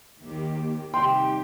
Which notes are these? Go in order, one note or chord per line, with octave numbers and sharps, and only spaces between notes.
D#2 D#3 A#3 G4
C3 G3 D#4 G4 G5 C6